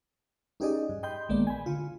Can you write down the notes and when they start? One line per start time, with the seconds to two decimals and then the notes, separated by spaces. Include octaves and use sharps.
0.60 C#4 D#4 G4 G#4 D5 D#5
0.89 G2
1.03 D#5 G5 B5 C6 G6
1.29 A#1 D#3 G#3 A#3 B3 D5
1.47 G#5 B5
1.66 D3 F4